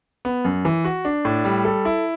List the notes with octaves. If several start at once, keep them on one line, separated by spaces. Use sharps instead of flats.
B3
F#2
E3
F#4
D4
A2
G3
A4
E4